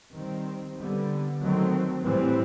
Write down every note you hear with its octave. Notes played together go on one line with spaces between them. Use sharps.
D#3 G3 C4
D3 G3 B3
D#3 F#3 A3 C4
A2 E3 G3 C4